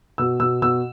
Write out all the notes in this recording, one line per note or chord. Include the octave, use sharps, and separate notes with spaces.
B2 E6
B2 E6
B2 E6